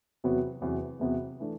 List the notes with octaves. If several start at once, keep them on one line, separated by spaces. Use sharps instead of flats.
E2 C3 F#3 B3 F#4
E2 C3 F#3 B3 F#4
E2 C3 F#3 B3 F#4
E3 A3 D4